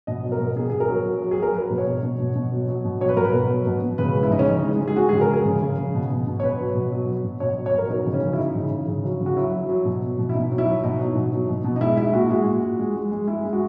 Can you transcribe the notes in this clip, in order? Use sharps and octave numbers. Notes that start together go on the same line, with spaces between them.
B2 D#5
F#3
A#4
B2
B2 G#4
B2 G#4
A#4
F#3
F#3
F#3
G#4
F#3
A#4
F#3 B4
B2
C#5
B2
B2
B2
B2
F#3
F#3
B2
F#3 C#5
B4
B2 A#4
B4
B2
F#3
B2
B2
C#3 B4
G#3
E4
C#3 D#4
C#4
C#3 D#4
G#3
G#3
G#4
G#3 F#4
G#4
C#3
A#4
G#3 G#4
C#3
C#3
C#3
B2
B2
B2
C#5
B2 B4
F#3
B2
F#3
F#3
B2
B2 C#5
F#3
C#5
B2 A#4
F#3 D#4
C#3
C#4
C#3
E4
F#3 D#4
C#3
C#3
C#3
F#3
C#3
F#4
F#3 E4
F#3
F#3
B2
F#3
B2
E4
B2 D#4
F#3
E4
F#3
B2 D#4
F#3
B2
F#3
B2
B2
D#4
G#3 E4
G#3 E4
A#2 F#4
G#3 F#4
A#2
A#2
G#3
G#3
G#3
G#3 E4
G#3
F#4